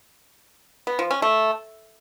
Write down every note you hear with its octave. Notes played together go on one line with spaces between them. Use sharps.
B3
F3
C#4
A3